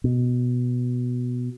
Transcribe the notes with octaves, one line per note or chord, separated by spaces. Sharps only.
B2